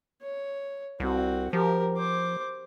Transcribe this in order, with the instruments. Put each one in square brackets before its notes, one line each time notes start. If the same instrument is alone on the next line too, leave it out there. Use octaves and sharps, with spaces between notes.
[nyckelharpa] C#5
[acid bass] C2 [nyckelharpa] C4 F#4
[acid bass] F3 [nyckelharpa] G4 A#4
[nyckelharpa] C5 D6